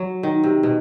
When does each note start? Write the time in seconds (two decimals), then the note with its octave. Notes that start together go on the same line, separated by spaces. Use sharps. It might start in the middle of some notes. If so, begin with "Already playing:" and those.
Already playing: F#3
0.23 D#3
0.44 C3
0.63 B2